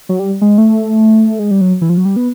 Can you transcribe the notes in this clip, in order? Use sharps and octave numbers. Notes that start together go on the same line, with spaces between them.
F#3
G3
G#3
A3
G#3
G3
F#3
E3
F3
F#3
G3
B3